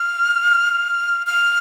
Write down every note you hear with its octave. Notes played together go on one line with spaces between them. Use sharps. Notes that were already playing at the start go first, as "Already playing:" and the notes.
Already playing: F6
F6